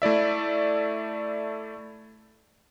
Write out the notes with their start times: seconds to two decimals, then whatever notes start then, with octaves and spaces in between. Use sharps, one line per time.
0.02 A3 E4 D5 E5